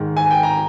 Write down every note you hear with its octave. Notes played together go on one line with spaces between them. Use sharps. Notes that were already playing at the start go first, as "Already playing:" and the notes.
Already playing: G#2 D#3 G#3
G#5
G5
A#5